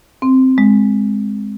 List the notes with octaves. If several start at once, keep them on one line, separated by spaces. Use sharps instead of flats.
C4
G#3